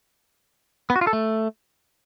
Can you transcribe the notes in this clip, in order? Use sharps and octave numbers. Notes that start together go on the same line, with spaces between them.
B3
F#4
F4
A4
A3